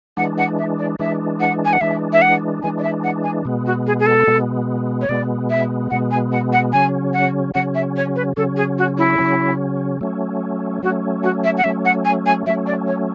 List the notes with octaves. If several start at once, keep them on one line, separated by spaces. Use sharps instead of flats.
E3 G#3 D4 F#5
F#5
E5
D5
E3 G#3 D4 E5
F#5
G#5
F#5
E3 G#3 D4 E5
E5
F#5
E3 G#3 D4 G#5
D5
E5
F#5
G#5
B2 G#3 B3
F#4
G#4
G#4
A4
B2 G#3 B3
C#5
B2 G#3 B3 D5
E5
B2 G#3 B3 F#5
G#5
F#5
F#5
C#3 F#3 C#4 G#5
F#5
C#3 F#3 C#4 F#5
E5
C#5
B4
C#3 F#3 C#4 A4
G#4
F#4
E4
C#3 F#3 C#4
F#3 A3 C#4
F#3 A3 C#4 F#4
F#4
E5
F#5
F#3 A3 C#4 E5
F#5
G#5
G#5
F#3 A3 C#4 E5
D5
C#5